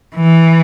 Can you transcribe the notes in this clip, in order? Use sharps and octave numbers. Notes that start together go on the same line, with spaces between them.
E3